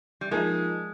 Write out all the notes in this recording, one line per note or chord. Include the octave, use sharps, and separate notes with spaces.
G3
F3 G#3 A#3 D#4